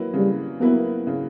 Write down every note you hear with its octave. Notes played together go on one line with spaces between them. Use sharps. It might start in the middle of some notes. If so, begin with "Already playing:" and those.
Already playing: F#3 A#3 E4 B4
C#3 G3
F#3 A#3 B3 E4 B4
C#3